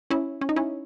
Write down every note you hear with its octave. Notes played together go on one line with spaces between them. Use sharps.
C#4 E4
C#4
D#4
C#4 E4